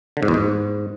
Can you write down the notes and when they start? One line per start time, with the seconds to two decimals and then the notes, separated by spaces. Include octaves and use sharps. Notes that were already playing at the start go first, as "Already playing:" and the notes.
0.17 D3
0.23 G#2
0.28 E2
0.34 G#2